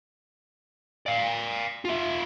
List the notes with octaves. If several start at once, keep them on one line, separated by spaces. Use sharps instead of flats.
D5 F5
F4 E5